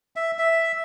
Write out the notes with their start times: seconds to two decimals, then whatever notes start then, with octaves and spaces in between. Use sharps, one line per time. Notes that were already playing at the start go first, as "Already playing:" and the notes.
0.16 E5
0.39 E5